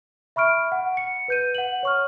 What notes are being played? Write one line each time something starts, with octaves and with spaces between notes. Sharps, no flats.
E5 B5 C#6 F6 D7
F#5
C#7
B4 G6 D#7
F#5 F#7
C#5 C#6 F6